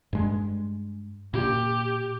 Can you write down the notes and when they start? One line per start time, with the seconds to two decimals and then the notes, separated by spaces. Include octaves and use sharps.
0.13 G2 G#3
1.34 A#2 G4